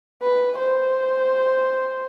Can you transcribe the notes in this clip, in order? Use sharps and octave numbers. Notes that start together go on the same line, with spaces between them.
B4
C5